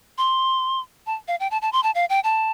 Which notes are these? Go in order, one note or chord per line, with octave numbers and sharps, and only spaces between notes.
C6
A5
F5
G5
A5
A5
C6
A5
F5
G5
A5